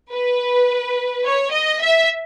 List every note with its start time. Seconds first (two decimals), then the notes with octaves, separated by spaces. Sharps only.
0.14 B4
1.26 C#5
1.53 D#5
1.81 E5